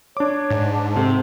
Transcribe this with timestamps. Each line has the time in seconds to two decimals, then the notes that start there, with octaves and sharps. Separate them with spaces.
0.17 D4 C#5 D6
0.50 G#2
0.73 A5
0.96 C3 A4